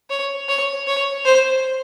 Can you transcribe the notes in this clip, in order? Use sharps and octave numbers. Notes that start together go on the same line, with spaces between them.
C#5
C#5
C#5
C5